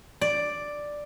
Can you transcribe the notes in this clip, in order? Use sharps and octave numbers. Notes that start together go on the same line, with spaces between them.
D5